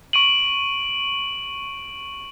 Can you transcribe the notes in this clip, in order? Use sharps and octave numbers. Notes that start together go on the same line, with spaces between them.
C#6 D7 D#7 F#7